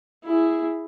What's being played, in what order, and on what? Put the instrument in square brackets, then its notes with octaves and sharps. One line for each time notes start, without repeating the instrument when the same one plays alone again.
[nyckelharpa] E4 G#4